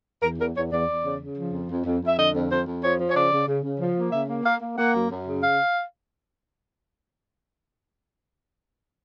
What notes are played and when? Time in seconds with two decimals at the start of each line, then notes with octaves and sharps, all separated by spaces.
0.22 E2 A#4
0.39 E2 A#4
0.55 E2 C#5
0.71 E2 D5
0.87 E2
1.04 C#3
1.20 C#3
1.36 F3
1.52 F2
1.69 F2
1.85 F2
2.01 F2
2.07 E5
2.17 D3 D#5
2.33 F2
2.49 F2 C5
2.66 F2
2.82 F3 C#5
2.99 F3
3.09 C#5
3.14 C#3 D5
3.30 C#3
3.47 C#3
3.63 C#3
3.79 F3
3.95 A#3
4.12 C#3 E5
4.28 A#3
4.44 A#3 F5
4.60 A#3
4.77 A#3 F#5
4.93 F#2
5.09 F#2
5.26 C#3
5.42 F5